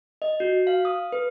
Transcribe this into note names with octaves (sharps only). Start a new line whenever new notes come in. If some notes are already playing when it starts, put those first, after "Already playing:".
D#5
F#4
F5
D#6
B4